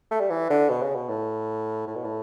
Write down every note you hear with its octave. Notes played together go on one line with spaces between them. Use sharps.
A3
G3
E3
D3
B2
C#3
B2
A2
A2
B2
A2